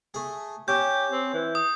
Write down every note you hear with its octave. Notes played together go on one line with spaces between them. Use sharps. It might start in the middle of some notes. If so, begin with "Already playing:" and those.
A3 G#4
C#4 G4 G6
C4
E3
D#6